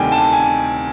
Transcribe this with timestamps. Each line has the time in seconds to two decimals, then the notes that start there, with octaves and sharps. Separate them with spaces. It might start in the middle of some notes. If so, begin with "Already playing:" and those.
Already playing: D2 C3 D#3 G3 G5 G#5
0.12 A5
0.33 G#5